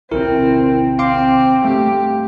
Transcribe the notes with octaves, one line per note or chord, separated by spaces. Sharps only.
A#1 D#2 C3 C4 E4 A#4
C4 F5 C6 D6
G2 A3 G4